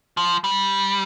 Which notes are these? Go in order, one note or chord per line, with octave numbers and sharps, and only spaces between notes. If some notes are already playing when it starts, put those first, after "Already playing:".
F3
G3